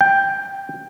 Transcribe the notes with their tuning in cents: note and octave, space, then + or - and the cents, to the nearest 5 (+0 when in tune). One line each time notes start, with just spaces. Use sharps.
G5 +10